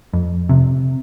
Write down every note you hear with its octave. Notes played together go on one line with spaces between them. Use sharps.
F2
C3